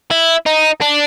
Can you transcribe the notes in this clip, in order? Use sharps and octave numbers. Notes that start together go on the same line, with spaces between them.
E4
D#4
D4